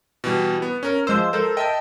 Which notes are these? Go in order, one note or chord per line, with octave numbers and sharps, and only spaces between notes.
B2 E3 G3
B3
C#4 A#4
F3 G#3 C5 E6 G6
A4 A#4 C5
D#5 E5 G5 A5